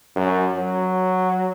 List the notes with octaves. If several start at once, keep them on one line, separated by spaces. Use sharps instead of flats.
F#2
F#3